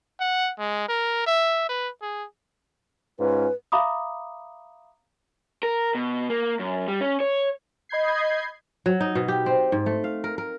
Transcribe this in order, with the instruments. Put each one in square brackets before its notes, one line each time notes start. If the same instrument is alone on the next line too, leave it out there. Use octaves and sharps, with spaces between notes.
[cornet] F#5
G#3
A#4
E5
B4
G#4
[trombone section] G#2 C#4 F4 [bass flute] B4
[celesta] E5 F5 A#5 B5 D6 D#6
[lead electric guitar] A#4
B2
A#3
F#2
G3
C#4
C#5
[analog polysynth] D#5 B5 G6 G#6 C7
[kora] F#3
D#4
B2
G4
C4
G#2
A3
F5
A#4
A#4